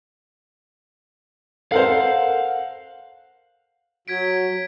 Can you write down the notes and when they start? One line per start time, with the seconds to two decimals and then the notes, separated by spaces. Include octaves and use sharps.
1.72 A4 A#4 C5 F5 F#5
4.08 F#3 G#6 B6 D7